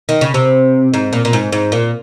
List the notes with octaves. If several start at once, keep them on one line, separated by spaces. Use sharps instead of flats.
D#3
C#3
C3
G#2
A#2
A#2
G#2
G#2
A#2